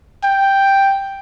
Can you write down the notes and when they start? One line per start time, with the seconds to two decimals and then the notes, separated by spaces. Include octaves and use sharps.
0.25 G5